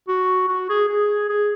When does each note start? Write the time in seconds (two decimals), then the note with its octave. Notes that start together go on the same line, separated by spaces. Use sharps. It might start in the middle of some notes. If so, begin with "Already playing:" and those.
0.08 F#4
0.48 F#4
0.69 G#4
0.89 G#4
1.29 G#4